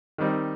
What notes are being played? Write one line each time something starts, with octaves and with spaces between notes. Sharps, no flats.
D#3 G3 C4 D#4